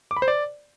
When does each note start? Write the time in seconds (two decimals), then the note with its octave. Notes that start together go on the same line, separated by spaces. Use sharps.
0.11 D6
0.17 B5
0.22 C5
0.28 D5